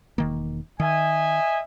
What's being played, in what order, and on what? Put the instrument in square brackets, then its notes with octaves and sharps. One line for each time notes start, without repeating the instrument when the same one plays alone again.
[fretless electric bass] E1 D#3 A#3
[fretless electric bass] D#3 [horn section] D#5 E5 G#5